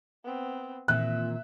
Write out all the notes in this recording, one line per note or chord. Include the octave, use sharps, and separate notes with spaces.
B3 C4
A#2 D#3 E3 C4 E5 F#6